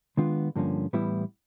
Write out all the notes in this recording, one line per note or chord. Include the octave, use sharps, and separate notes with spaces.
D#3 G#3 B3 D4 F4
G2 D3 F3 A#3 C#4
A2 E3 G3 B3 E4